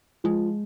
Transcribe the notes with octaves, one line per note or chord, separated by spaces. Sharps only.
F3 G#3